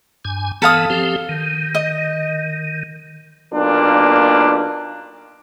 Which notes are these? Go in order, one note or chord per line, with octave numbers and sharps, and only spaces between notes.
G2 G#5
E3 B3 A4 F5 D#6
F3 C4 G4
D#3
D#5
B1 A#2 A#3 D4